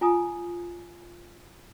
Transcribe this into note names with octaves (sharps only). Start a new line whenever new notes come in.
F4 G#5 A#5 D#6